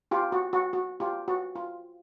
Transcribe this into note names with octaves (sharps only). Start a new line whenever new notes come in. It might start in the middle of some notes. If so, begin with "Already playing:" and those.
F4 G4
F#4
F#4
F#4
F4 G4
F#4
F4